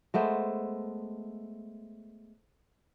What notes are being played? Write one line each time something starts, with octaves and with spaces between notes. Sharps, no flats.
G#3 A3 B3 C5